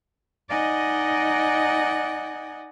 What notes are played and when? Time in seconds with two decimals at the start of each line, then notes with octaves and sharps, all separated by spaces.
0.50 D#4 D5 D#5 F#5 G#5